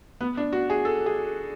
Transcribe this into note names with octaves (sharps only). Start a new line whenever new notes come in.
B3
D4
F#4
G#4
A4
G#4